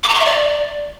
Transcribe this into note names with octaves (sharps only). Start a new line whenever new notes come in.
D6
A#5
C#6
E5
D5